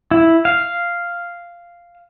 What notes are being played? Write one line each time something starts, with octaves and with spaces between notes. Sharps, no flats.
E4
F5